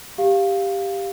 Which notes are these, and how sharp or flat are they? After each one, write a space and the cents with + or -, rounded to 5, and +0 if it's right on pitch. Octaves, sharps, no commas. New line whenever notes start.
G4 +5 F5 +0